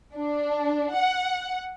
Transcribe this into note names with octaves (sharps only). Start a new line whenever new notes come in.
D4
F#5